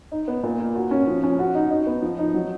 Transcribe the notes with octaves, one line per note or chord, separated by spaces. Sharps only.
D#4
B3
A#2
A#3
F#4
C#4
F3
C#4
F#4
D#4
D#4
B3
F3
D#4
F#3